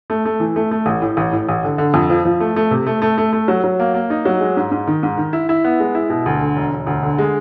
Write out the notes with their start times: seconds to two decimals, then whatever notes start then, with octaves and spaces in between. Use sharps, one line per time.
0.10 A3
0.25 A3
0.40 E3
0.56 A3
0.71 A3
0.86 A1
1.02 A2
1.17 A1
1.32 A2
1.49 A1
1.64 D3
1.78 D3
1.94 F2
2.10 F3
2.25 F3
2.40 A3
2.56 A3
2.71 C3
2.87 A3
3.02 A3
3.18 A3
3.33 A3
3.48 F#3
3.64 F#3
3.80 A#3
3.94 A#3
4.10 D#4
4.25 F#3
4.40 G#3
4.57 G#2
4.71 G#2
4.87 D#3
5.03 G#2
5.17 D#3
5.33 E4
5.49 E4
5.64 B3
5.80 G#3
5.95 E4
6.10 B2
6.26 D2
6.41 D3
6.56 E1
6.72 E1
6.87 D2
7.03 D3
7.18 G#3